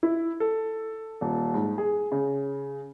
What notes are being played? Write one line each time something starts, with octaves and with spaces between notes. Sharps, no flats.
E4
A4
D#1
G#2
G#4
C#3